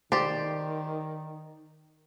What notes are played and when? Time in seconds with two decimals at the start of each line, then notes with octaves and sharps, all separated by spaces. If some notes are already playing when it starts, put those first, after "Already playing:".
0.12 D#3 G4 C5 D5